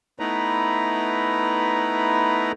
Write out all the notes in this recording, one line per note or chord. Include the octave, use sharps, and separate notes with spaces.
A3 B3 D#4 E4 B4 A#5